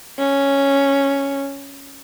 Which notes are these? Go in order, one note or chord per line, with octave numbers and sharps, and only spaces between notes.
C#4